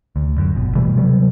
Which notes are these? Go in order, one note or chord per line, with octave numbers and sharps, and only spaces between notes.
D2
F#2
G1 B2
B2 E3 G3 A3
C3 F#3 G3